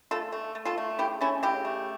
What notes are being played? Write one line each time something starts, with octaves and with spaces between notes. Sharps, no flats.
A3 F4 A4
A3
A3
F4 A4
A3
C#3 E4 G4
A3 C#4 E4
C#3 E4 G4
A3